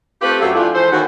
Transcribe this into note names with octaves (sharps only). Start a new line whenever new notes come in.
A3 C4 F4 G4 B4
F#2 F#3 A3 C4 E5 F5
F3 G#3 A3 D4 E4 F4
E3 G#3 A4 C5
D#2 F#4